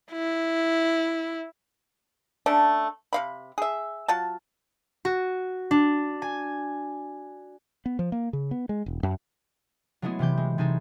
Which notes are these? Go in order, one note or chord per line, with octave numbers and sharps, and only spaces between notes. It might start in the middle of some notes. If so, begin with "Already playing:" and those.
E4
A3 C#4 D4
C3 F5 B5
G#4 E5
F#3 F4 A5
F#4
D4
G#5
B3
F3
A#3
C#3
B3
G#3
E1
F#2
F#3 G#3 A3 B3 E4 G#4
C3 E3 G4 G6
G#3
C3 E3 D#4 G#4 A4